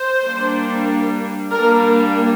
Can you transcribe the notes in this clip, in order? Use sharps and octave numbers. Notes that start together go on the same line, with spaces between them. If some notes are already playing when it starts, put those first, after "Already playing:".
Already playing: C5
G3 A#3 D4
G3 A#3 D4 A#4